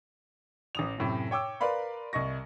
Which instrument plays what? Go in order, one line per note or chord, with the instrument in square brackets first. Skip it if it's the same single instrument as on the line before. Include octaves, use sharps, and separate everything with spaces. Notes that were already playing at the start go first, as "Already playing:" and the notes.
[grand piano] A1 D#6 F7
F#2 A2 C3
C#5 G5 D6 E6
A#4 B4 D5 F5 B5 C6
C2 D#5 C#6 A#6